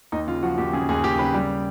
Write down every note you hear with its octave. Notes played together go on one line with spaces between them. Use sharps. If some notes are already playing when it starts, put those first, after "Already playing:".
D#2 D#4
C#3 F4
F3 F#4
D#2 G4
C#3 G#4
D#2 G#4
D#2 G4
C#3 B4
G3